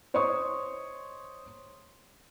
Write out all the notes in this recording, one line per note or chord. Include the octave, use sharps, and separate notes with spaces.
C5 C#5 D#5 C6 C#6 D#6